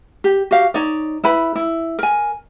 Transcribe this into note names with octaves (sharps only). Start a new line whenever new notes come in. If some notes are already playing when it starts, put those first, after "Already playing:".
G4
F#4 G4 F5
D#4 C#5 D5
E4 B4 B5
E4
A#4 G#5